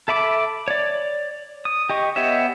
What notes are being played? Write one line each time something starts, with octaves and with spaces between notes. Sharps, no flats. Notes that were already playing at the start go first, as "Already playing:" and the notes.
A4 E5 B5 D6
C#5 D5
D#6
G4 D#5 C#6
B3 G4 C#5 D#5 E5